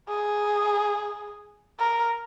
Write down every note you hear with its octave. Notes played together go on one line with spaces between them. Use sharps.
G#4
A#4